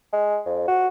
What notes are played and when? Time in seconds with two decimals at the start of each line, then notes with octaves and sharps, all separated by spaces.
0.13 G#3
0.46 F2
0.68 F#4